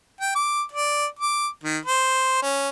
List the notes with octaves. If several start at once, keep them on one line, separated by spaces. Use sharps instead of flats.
G5
D6
D5
D6
D#3
C5
C#4